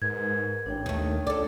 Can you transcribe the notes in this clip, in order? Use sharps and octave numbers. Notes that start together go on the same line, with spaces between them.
G#2 A#4 B4 G#6
A1 D4 C#5 G5
D#2 D#3 A3
C#2 A4 D5